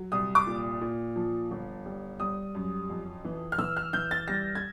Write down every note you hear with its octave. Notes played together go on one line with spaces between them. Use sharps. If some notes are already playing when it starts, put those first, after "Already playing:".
Already playing: F#3
C2 D#6
D6
A#2
A#2
F3
G1
G3
G3 D#6
F#2
F2
E3
F6
E3 E6
F6
E3 G6
A6
G3 A#6
G#6